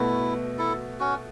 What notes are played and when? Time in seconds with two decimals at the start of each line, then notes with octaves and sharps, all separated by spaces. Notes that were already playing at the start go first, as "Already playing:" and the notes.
Already playing: B2 A3 E4 F#4
0.59 E4 A4
1.00 C#4 F#4